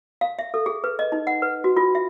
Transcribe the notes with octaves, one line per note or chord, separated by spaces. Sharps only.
F5
E5
A4
G#4
B4
D#5
D#4
F#5
B4
F#4
F4
E5